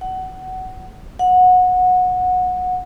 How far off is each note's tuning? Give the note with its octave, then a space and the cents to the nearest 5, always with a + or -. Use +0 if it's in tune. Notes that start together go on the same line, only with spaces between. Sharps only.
F#5 +20
F#5 -20